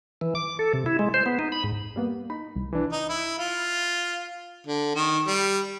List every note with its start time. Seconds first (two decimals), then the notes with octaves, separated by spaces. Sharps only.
0.21 E3
0.35 D6
0.59 A4
0.73 C3
0.86 E4
0.99 G#3
1.14 C5
1.26 B3
1.39 D#4
1.52 B5
1.64 G#2
1.96 G3 A#3 B3
2.30 D#4 B5
2.56 C2
2.73 E3 D4
2.91 D#4
3.09 E4
3.38 F4
4.67 D3
4.95 D#3
5.27 G3